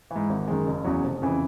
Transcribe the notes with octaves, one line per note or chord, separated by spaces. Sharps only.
E3
G#2
G#1
F#2 D#3 G#3
F#1
E2 C#3 F#3
F1
F2 C#3 E3